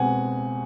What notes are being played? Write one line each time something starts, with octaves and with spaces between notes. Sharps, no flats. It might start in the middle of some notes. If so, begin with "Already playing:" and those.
Already playing: B2 G#3 C4 F#5 G#5